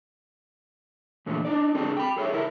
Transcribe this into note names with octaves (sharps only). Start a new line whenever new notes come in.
E2 A#2 D3 F3 A3
D4 D#4 D5
C4 D4 G#4 A4
G5 B5
G#4 A4 C#5 E5
E4 A4 A#4